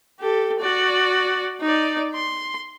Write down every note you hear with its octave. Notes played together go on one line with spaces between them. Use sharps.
G4 A4
F#4 D5
D#4 D5
C6